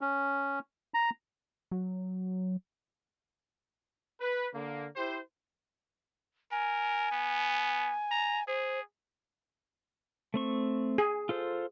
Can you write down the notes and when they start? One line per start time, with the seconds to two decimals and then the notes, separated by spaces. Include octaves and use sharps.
0.01 C#4
0.94 A#5
1.71 F#3
4.20 B4
4.55 D3 A#3
4.96 E4 G4 C5
6.51 A#4 G#5
7.12 B3
8.11 A#5
8.48 G#4 C5
10.34 A3 C4 C#6
10.98 G#4
11.29 F4 A4 C5